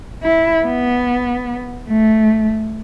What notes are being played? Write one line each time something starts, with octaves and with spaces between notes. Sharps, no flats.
E4
B3
A3